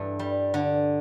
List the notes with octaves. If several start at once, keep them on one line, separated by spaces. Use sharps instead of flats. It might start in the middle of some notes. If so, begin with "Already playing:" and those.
Already playing: G2 E3 A4
G3
D3